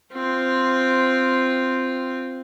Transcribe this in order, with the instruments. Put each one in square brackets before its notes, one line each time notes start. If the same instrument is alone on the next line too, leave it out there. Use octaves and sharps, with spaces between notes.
[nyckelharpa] C4 F4